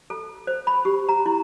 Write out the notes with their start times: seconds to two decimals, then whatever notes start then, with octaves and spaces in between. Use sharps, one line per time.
0.10 A4
0.47 C5
0.67 B5
0.85 G4
1.09 A#5
1.26 E4